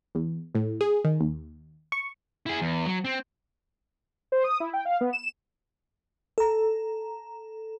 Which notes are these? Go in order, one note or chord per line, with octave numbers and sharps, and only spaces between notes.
E2
A2
G#4
D#3
D#2
C#6
E4 G#4
E2
F#3
C4
C5
D#6
E4
G5
F5
B3
E7
A4 A#5